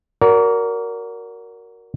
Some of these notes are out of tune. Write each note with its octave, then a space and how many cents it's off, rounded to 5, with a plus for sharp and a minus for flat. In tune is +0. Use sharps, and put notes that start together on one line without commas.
F#4 +0 A#4 +0 D5 -40